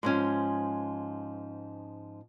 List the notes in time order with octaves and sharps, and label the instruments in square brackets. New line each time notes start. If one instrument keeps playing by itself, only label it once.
[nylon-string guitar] G#2 F3 C#4